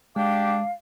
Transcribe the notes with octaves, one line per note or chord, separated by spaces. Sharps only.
G#3 D4 G4 F5